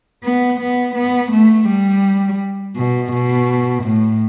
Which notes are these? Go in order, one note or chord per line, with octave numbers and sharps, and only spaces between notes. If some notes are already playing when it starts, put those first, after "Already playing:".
B3
B3
B3
A3
G3
B2
B2
A2